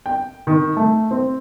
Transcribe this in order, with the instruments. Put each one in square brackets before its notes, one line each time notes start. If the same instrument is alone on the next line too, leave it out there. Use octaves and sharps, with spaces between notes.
[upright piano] G5
D#3
A3
C4